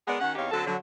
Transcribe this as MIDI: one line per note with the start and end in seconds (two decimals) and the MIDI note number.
0.07 0.16 56
0.07 0.16 59
0.07 0.16 68
0.07 0.16 70
0.07 0.16 74
0.07 0.16 78
0.20 0.34 51
0.20 0.34 61
0.20 0.34 66
0.20 0.34 78
0.36 0.47 40
0.36 0.47 60
0.36 0.47 63
0.36 0.47 67
0.36 0.47 73
0.36 0.47 77
0.51 0.64 50
0.51 0.64 54
0.51 0.64 60
0.51 0.64 69
0.67 0.75 50
0.67 0.75 54